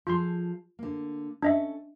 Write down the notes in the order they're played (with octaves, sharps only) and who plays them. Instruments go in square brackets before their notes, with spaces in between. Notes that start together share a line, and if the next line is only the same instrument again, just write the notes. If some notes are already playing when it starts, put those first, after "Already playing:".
[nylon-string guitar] F3 G#4 A4 [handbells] F4 C6
[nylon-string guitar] D3 A#3
[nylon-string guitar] C#4 A4 [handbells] D4 D#5 E5